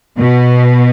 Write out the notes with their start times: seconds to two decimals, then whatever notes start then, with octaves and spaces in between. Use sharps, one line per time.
0.18 B2